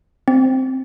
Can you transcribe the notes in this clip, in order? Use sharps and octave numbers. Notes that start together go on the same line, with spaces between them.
C4